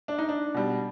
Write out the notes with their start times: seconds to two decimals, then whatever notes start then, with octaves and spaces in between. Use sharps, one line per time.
0.08 D4
0.18 D#4
0.29 D4
0.54 B2 G3